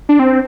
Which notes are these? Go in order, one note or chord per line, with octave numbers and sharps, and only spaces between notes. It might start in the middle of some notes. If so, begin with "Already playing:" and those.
D4
C4